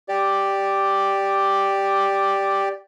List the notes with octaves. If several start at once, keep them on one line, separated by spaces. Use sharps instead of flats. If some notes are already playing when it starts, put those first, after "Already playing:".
G4 D5